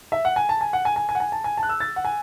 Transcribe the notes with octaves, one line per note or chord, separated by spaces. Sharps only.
E5
F#5
G#5
A5
G#5
F#5
G#5
G#5
G#5
F#5
G#5
A5
G#5
A5
F#6
E6
A6
F#5
G#5